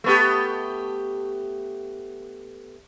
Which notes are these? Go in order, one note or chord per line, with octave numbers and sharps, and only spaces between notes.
A3 B3 G4